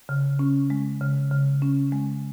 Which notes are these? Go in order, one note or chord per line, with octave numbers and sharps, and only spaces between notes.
C#3
C#4
G#3
C#3
C#3
C#4
G#3